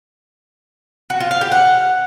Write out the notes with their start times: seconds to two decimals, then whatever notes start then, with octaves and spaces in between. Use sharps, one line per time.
1.10 F#4
1.20 F4
1.31 F5
1.41 G4
1.52 F#5